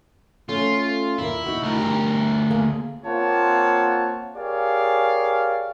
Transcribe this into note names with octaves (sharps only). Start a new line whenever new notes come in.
A3 C#4 F4
D#2 A#2 E4 A#4
D#4 F#4
D2 A#4
G4
A#3 G#4
A#3 C4 F4 C#5 F#5 A5
G4 G#4 A#4 C#5 D5 F5